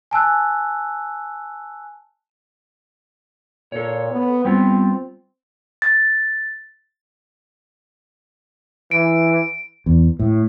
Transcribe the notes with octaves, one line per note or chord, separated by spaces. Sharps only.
G#5 A5 E6 F#6
A#2 A4 C#5
B3
G3 B3 C4 F4
A6
E3 D7
E2
A2